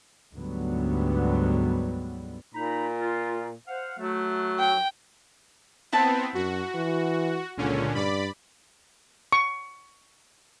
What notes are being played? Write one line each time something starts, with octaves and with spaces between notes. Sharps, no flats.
D2 G#2 D3 F#3 G3 B3
A#2 D#4 A#5 B5
F4
C5 F5 F#5
F#3 A3
G5
B3 C4 E4 A5
F#2 F#4
E3
C#2 A#2 D3 C#4
G2 D5 B5
C#6